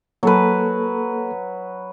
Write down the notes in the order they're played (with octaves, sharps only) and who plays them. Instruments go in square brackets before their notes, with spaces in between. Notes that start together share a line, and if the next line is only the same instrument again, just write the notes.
[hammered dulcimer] F#3 B4 [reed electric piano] A#3 A4